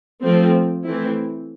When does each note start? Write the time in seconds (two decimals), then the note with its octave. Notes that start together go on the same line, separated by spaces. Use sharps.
0.23 F3 A3 C4
0.84 E3 A3 C4 E4